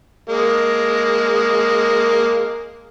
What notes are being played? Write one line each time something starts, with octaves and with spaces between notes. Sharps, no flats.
G#3 A#3